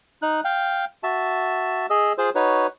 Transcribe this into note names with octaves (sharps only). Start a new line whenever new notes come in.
D#4 F#6
F5 G5
F#4 E5 A5
G#4 D#5 E6
F4 G#4 C5
D#4 F#4 B4 C#5